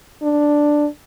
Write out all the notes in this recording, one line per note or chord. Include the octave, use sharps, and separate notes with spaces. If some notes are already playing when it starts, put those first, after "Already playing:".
D4